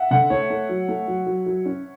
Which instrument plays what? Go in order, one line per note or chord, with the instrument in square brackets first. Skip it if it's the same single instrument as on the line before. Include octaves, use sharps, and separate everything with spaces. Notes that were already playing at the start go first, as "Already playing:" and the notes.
Already playing: [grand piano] E5 F#5
[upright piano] D3 [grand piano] F#5
[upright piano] A3 [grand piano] C#5
[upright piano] A3
F#3
A3
F#3
F#3
F#3
C#4